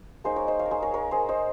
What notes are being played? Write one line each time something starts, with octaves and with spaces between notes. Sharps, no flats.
A#3 D#4 G#4 C5
A#4 C#5
C5 D#5
C#5 F5
A#4
G#4 C5
A#4 C#5
A#4 C#5
G#4 C5
C5 D#5